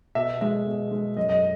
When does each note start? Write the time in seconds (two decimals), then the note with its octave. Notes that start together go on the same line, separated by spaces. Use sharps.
0.15 B2 E5
0.41 G#3 E5
0.67 B2
0.91 G#3
1.17 F#2 D#5
1.29 D#5